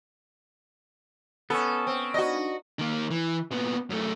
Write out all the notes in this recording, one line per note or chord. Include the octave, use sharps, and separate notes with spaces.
B3 C#4 A4
C4
D4 D#4 F#4 D#5
D#3 A#3
E3
A#2 B3
F#2 A3